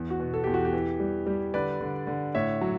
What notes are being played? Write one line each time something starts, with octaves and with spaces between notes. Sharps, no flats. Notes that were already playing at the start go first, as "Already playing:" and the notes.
Already playing: E2
F#4
B2
A4
E2 G4
F#4
G4
E3
G3
G3
D3 B4 D5
D3
D3
A2 C#5 E5
F#3